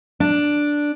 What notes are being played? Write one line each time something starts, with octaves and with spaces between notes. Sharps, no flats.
D4